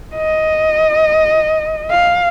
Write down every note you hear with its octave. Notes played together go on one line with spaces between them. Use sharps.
D#5
F5